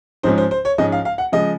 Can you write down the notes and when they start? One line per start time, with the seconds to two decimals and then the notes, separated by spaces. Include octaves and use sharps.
0.23 G#2 F3 G#3 C#4 C5
0.38 C5
0.51 C5
0.65 C#5
0.78 G#2 F3 G#3 C#4 D#5
0.92 F5
1.05 F5
1.18 F#5
1.32 C#3 F3 G#3 D#5